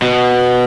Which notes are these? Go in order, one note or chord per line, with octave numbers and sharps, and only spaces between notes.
B2